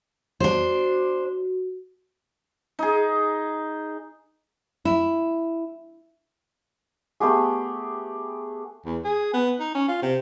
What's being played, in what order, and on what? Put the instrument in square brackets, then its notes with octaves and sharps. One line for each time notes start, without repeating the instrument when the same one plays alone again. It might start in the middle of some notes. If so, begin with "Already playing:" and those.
[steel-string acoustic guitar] D4 C5 [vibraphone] F#4
[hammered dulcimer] D#4 G#4
[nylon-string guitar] E4
[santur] A3 B3 G4 G#4
[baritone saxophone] E2
G#4
B3
D#4
C#4
F4
C3